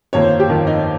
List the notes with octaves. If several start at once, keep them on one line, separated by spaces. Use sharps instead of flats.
G1 F2 D#3 A#3 C#5
C5
G4
G1 F2 D#3 A#3
D#4